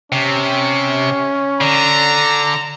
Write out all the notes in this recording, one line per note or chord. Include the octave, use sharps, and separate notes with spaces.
C3 C#4
D3 A#5